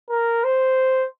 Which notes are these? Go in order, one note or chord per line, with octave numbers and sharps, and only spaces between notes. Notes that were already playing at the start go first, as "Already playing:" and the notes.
A#4
C5